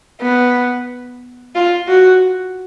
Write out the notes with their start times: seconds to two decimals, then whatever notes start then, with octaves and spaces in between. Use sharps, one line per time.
0.22 B3
1.55 F4
1.88 F#4